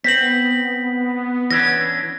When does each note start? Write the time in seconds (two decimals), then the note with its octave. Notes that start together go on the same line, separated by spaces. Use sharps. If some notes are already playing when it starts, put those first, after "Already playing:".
0.04 B3 C4 B6 F#7
1.51 E3 C#4 D4 A#6